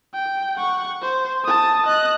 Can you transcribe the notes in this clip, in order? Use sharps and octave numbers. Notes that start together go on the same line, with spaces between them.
G5
F#5 C#6
C5
A5 D#6
D#5 F#6